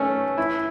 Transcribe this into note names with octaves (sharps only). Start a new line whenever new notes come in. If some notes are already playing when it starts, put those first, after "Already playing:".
Already playing: A3 C#4
E4